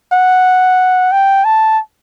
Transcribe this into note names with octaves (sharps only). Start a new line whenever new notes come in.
F#5
G5
A5